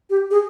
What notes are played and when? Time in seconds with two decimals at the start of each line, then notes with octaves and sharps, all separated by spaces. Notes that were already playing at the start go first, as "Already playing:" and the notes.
0.10 G4
0.31 G#4